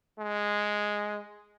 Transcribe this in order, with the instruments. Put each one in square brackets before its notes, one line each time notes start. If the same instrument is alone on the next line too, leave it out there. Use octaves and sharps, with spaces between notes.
[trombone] G#3